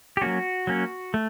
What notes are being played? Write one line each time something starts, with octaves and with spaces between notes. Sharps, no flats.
G4
F#3 A#3 C#4 F#4
F#3 A#3 C#4
A3